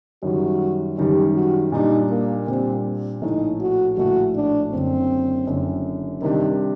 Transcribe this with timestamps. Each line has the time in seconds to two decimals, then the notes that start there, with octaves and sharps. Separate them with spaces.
0.23 F#2 D#3 G3 F#4
0.98 F#2 D#3 G3 G4
1.35 F#4
1.72 A#2 G3 D4 D#4
2.10 A#3
2.47 A#2 G3 C4 D4
3.22 A#1 A2 A3 D#4
3.60 F#4
3.97 A#1 A2 A3 F#4
4.35 D4
4.72 F#1 F#2 D3 C4
5.47 F#1 F#2 D3
6.21 C3 D#3 G3 D4 G4